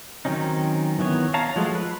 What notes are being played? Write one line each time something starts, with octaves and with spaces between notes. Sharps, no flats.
D#3 F#3 C4 C#4 D#4
D#3 E3 B3 C#5
C#5 F5 A5 A#5
F3 F#3 G#3 A3
B4